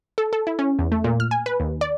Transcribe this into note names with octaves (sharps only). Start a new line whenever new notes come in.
A4
A4
E4
C#4
E2
A3
A#2
F6
G#5
B4
D#2
D5